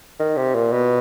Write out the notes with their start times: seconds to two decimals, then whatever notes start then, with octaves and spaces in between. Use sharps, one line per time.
0.20 D#3
0.37 C3
0.55 A#2
0.72 B2